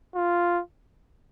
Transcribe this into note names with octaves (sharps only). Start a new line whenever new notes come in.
F4